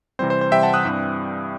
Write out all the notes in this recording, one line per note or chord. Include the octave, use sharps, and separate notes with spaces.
C3 E3 G3 C4 C5
C5
C5
C3 E3 G3 C4 E5 G5
F#5 A5
D#6 F#6
G2 E3 G3 C4